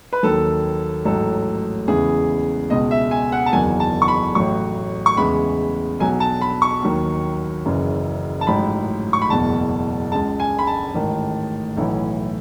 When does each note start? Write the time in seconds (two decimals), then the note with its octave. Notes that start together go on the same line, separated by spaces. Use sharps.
0.13 B4
0.23 D#2 D#3 F#3 A4
1.05 A1 G#2 F#3 A4
1.88 E2 C#3 E3 G#3 G#4
2.70 C#2 B2 G#3 D#5
2.91 E5
3.11 G#5
3.32 F#5
3.46 A5
3.53 F#1 E2 D#3 F#3 G#5
3.80 A5
4.02 C#6
4.08 B5
4.35 A1 A2 F#3 C#6
5.06 C#6
5.17 E2 C#3 E3 G#3 B5
6.00 B1 B2 F#3 G#5
6.20 A5
6.41 B5
6.62 C#6
6.82 D#2 D#3 F#3
7.65 F#1 F#2 C#3 E3
8.41 A5
8.47 A1 G#2 F#3 B5
9.13 C#6
9.22 B5
9.29 F#1 E2 B2 A5
10.12 C#2 C#3 G#3 A5
10.40 G#5
10.59 B5
10.67 A5
10.94 A1 G#2 D#3
11.77 B1 A2 E3